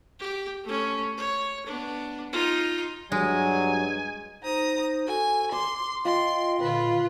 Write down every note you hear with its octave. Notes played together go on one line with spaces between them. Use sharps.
G4
A3 C#4
C#5
B3 D4
D#4 F4
G2 F#3 G#3 G#5
D#4 C5 A#5 D#6
F#4 A4 G#5
C6 D6 E6
F4 D#5 G5 C6
A#2 D3 F4 B4 D#6